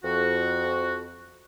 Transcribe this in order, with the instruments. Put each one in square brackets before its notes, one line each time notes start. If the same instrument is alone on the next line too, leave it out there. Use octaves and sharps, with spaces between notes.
[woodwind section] F2 F#4